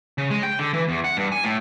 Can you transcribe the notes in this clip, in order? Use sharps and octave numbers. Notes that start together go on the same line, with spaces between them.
C#3
G#3
G5
D3
E3
E2
F#5
G2
G#5
A2